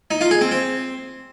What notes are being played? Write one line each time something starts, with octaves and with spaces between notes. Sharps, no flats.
D#4
F4
G#4
C4
C4